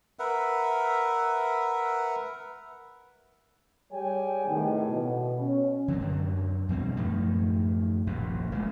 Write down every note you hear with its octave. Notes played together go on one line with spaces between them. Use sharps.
A#4 B4 E5 F#5
G3 G#4 C#5 G5 G#5
E2 A2 C3 D#3
B2
C#4
D3 F#3 B3 C4
F#2 F#3 D4
E2 B2 G3 C4
F#2 A2 D#3 F3
D#1 A#1 F#2 C3
D1 A1 A#2 G#3